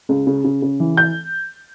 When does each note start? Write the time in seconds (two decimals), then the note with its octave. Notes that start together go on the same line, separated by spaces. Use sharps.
0.09 C#2
0.27 C#3
0.44 C#3
0.62 C#3
0.80 E3
0.97 G6